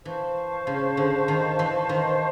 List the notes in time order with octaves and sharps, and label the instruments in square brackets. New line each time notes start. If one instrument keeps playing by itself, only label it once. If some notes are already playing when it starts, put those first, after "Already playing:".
[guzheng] E3 [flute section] C5 F5 A5 C#6
[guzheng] C#3
D3
D#3
E3
D#3